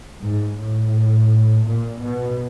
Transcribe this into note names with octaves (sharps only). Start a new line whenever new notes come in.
G#2
A2
A#2
B2